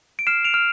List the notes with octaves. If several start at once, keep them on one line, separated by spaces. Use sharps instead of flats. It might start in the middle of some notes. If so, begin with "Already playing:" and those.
D7
F6 C7 E7
D7 F7
F6